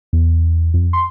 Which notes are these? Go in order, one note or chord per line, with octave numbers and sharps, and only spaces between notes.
E2
F2
C6